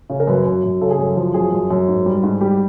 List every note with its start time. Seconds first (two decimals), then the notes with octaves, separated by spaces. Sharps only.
0.09 C#3
0.20 A#4
0.27 F#2 B4
0.46 F#2
0.64 F#2
0.81 C#3 A4
0.91 G#4
0.99 F#2 A4
1.17 F3
1.34 F#2 G#4
1.52 F#2
1.71 F#2
1.88 G#2
2.06 G3
2.23 G#2
2.41 G3 G4